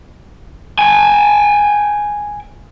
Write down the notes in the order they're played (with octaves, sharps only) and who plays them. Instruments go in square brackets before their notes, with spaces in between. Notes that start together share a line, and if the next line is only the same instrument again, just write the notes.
[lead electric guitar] G5 G#5